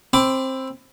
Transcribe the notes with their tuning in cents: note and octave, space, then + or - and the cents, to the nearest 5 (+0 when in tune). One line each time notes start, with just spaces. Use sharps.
C4 +15 B5 +30 D6 +0